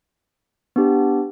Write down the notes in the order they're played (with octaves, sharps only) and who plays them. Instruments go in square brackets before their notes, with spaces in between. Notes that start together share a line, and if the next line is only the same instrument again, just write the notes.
[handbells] B3 D4 G4